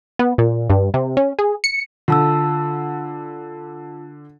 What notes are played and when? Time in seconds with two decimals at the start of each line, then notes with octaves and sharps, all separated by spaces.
0.19 B3
0.38 A#2
0.70 G2
0.94 C3
1.17 C#4
1.39 G#4
1.64 C#7
2.08 D3 F4 A5 E6